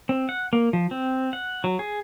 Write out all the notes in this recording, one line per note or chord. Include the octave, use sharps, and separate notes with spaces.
C4
F#5
A#3
F3
C4
F#5
F#3
G#4